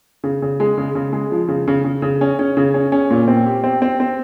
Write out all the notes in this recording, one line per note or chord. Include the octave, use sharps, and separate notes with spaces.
C#3
C#3
G#3
C#3
C#3
G#3
F3
C#3
C#3
C#3
C#3
C#4
C#4
C#3
C#4
C#4
A#2
C4
G4
C4
C4
C4